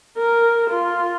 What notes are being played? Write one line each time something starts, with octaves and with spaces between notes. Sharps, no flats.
A#4
F4